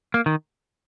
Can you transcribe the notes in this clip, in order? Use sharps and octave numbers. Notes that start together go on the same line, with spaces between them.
A#3
D#3